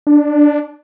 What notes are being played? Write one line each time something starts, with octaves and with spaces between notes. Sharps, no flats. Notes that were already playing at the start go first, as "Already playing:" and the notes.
D4